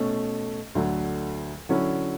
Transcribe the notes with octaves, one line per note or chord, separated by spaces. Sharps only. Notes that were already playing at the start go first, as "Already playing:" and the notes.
Already playing: B2 A3 C#4
D2 D3 F#3
D3 F#3 C#4 E4